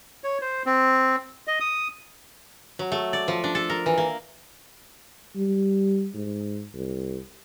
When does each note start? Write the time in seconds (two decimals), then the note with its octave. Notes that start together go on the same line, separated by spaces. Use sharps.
0.24 C#5
0.42 C5
0.66 C4
1.47 D#5
1.60 D#6
2.79 F#3
2.92 A3
3.13 D5
3.28 F3
3.44 D4
3.55 A4
3.70 A#4
3.86 E3
3.98 A#3
5.36 G3
6.15 G#2
6.74 C2